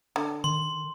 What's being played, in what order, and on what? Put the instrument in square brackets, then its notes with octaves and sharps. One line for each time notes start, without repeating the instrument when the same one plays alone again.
[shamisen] D3
[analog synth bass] D#3 [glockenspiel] C6